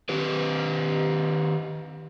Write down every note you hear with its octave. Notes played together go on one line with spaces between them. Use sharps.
D#3 G4 B4